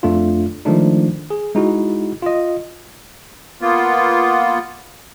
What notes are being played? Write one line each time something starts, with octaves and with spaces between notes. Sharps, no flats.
F2 A3 D4 F4
D#3 F3 G#3 A3 D4 D#4
G#4
G#3 D#4 E4 F#4
F4 D#5
A#3 B3 F4